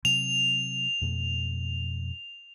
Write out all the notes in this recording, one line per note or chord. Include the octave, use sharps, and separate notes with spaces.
C3 F#3 C4 F7
F2 B2 A3